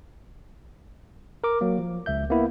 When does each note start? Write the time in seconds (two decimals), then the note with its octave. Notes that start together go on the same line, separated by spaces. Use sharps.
1.44 A#4 D6
1.61 F#3 A#3
1.79 F3
2.06 C#2 E5 G6
2.30 A#3 B3 E4